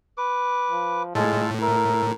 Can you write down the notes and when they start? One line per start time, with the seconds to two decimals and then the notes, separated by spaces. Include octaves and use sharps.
0.18 B4 D6
0.71 F3
1.15 A2 G#3 F4 A4 A5
1.62 A#4 E5